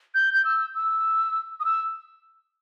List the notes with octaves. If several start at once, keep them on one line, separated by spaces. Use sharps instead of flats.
G6
G6
E6
E6
D#6
E6